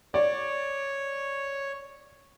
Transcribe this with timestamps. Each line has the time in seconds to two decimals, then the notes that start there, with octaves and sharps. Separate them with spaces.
0.14 C#5 D5